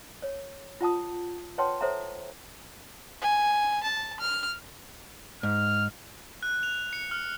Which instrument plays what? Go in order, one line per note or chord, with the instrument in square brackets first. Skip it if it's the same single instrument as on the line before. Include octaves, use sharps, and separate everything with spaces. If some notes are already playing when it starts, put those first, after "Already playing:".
[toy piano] C#5
F4 F#5 A5 D#6
B4 C#5 F#5 G5 A5 C6
A4 C5 C#5 E5 F#5 A#5
[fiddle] G#5
A5
F6
[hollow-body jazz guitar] G#2 [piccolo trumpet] F6
[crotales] F#6
F7
C#7
F6